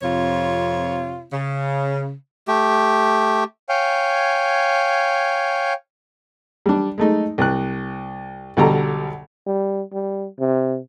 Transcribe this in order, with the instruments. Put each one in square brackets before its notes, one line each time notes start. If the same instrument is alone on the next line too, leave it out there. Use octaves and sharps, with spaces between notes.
[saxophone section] F2 C3 F4 C#5
C#3
[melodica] A3 G4
[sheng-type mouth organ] C#5 F5 G5 G#5
[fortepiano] G3 D4
G#3 A3 D#4
C2 F#6
B1 B2 D3 G3 A#5
[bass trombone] G3
G3
C3